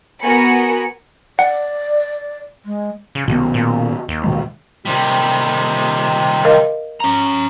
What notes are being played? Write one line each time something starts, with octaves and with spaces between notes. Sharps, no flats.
B3 F#4 A#4 G#5 B5 C#7
D5 F#5
G#3
C#3
C2 B2 D#3 B3
A#2
D#2
B2 D#3 G#3
C3 D#3 G3
A#4 D#5 F5
C#4 A#5